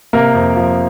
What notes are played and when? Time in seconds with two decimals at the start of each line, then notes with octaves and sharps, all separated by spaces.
0.13 C3 A#3 A#4
0.35 F2
0.56 F3